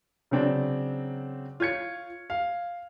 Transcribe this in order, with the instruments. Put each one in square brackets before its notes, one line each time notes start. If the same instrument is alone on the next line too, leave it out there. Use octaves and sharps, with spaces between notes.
[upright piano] C#3 F#3 C4 D4
F4 C#5 G#6 C#7
F5